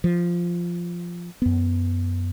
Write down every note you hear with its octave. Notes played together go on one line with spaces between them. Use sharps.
F3
F#2 B3